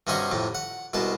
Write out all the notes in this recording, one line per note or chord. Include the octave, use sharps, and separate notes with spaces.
G2 C3 C#4 F#4 G#4 D#5
F2 A2 C3
F#5
C2 B2 G#3 A5